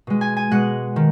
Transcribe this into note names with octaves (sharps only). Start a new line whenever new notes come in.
B2 G#3
G#5
G#5
B2 G#3 F#5
D#3